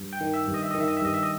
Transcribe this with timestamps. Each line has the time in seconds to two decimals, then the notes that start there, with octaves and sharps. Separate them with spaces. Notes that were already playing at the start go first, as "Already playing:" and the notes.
Already playing: G2
0.13 G5
0.21 D#3
0.34 E5
0.47 G2
0.54 D#5
0.63 E5
0.71 D#5
0.75 D#3
0.80 E5
0.88 D#5
0.97 E5
1.02 G2 D#5
1.14 E5
1.23 D#5